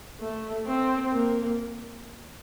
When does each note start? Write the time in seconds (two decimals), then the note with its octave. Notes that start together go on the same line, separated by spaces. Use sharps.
0.21 A3
0.67 C4
1.12 A#3